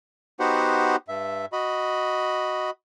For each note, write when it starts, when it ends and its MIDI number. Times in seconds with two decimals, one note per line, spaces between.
0.40 0.96 59
0.40 0.96 63
0.40 0.96 66
0.40 0.96 67
0.40 0.96 72
0.40 0.96 78
1.08 1.46 43
1.08 1.46 76
1.53 2.70 66
1.53 2.70 75
1.53 2.70 83